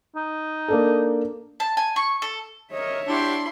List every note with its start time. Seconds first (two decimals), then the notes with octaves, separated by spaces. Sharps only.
0.16 D#4
0.68 A#3 D4 A4
1.60 A5
1.77 G#5
1.96 C#6
2.22 A4
2.72 A#4 C#5 D#5 E5
3.08 D4 E4 F#4 G4 C6